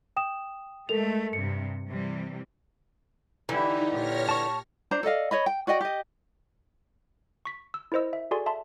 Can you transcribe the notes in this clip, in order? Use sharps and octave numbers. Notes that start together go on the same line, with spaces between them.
G5 D#6 E7
G#3 A3 A4 A#4 F7
G2 C3 C#7
C3 E3 G3
D3 E3 D#4 E4 G4
A#2 G4 C#5 F6 A#6
A5 C#6
D4 C5 A#5
A4 D5 D#5 F5
C#5 D#5 B5
G5
F#4 D5 D#5 G5
G4 D#5
C#6 B6
E6
E4 A#4 C5 D#5 E6
E5
F#4 G#4 A4 D5 G#5 C6
E5 A5 C6